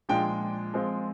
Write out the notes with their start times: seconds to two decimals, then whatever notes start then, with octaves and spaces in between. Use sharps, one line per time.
0.09 A#2 F3 G#3 D4 G5
0.74 F3 G#3 C4 F4